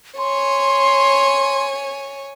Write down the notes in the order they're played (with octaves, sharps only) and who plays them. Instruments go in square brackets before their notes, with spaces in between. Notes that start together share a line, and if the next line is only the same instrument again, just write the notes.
[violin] C#5 G#5 [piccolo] C6